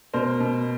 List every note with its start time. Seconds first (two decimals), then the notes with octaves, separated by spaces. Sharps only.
0.13 B2 A#4 C5
0.40 B2